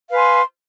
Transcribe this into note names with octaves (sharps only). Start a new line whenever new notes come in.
B4 F5 G#5 C6